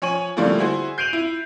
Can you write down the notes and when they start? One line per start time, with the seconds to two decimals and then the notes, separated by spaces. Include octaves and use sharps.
0.02 F3 C#5 G#5 C#6 D#7 F#7
0.37 D3 F3 G3 A3 A#3 E4
0.59 E4 F#4 G#4 C5
0.98 G6 C7 D7 D#7 F7 F#7
1.13 E4